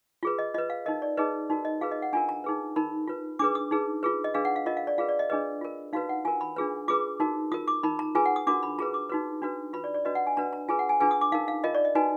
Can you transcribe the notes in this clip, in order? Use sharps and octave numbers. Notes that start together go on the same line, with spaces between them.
F4 G#4 B4
D#5
F4 B4 D#5
F5
D#4 A#4 D#5
D5
D#4 G#4 B4 D#5
D#4 F#4 A#4
D#5
F4 G#4 B4 F5
D#5
F#5
D4 F4 A#4 G#5
A#5
D#4 G#4 B4
D#4 A#4 B5
F4 B4
D4 G#4 B4 D6
D#6
D#4 G#4 B4
F4 G#4 B4
D#5
D4 G#4 B4 F5
F#5
F5
F4 A#4 D#5
F5
D5
F4 G#4 B4 F5
D5
D#5
D4 G#4 B4 D#5
F4 A#4
D#4 F#4 B4 F5
F#5
F4 A#4 G#5
B5
D4 F4 G#4 B4
F4 G#4 B4 D6
D#4 F#4 A#4
F4 A#4 D#6
D6
D#4 A#4 B5
A#5
F4 G#4 B4 G#5
F#5
D#6
D4 F#4 A#4 D6
B5
F4 G#4 B4 A#5
D6
D#4 F#4 B4
D4 F#4 B4
F4 B4 B5
D5
D5
D4 F#4 B4 D#5
F#5
G#5
D4 F#4 B4 A#5
A#5
F4 G#4 B4 G#5
F#5
G#5
D4 F4 G#4 B4 G#5
D#6
D6
D#4 A#4 F5
F5
F4 A#4 D#5
D5
D#5
D#4 F#4 B4 G#5